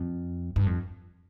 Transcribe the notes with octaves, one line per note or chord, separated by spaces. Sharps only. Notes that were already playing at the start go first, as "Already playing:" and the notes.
Already playing: F2
G2
F2